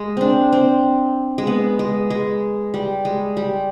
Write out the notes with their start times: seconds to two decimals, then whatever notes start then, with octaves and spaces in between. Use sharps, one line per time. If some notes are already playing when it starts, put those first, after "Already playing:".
Already playing: G#3
0.17 C4 D4
0.53 C4
1.38 G#3
1.47 B3
1.79 G#3
2.10 G#3
2.74 G3
3.05 G#3
3.37 G3